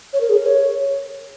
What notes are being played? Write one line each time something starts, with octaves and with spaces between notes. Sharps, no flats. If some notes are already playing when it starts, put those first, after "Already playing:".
C#5
A#4
G#4
A#4
C#5